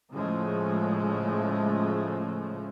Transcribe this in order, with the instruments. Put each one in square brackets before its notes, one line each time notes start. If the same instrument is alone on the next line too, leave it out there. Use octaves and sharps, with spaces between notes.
[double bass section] A2 C#3 F3 G#3 A3